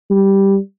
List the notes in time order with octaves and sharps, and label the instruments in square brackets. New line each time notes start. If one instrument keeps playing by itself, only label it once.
[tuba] G3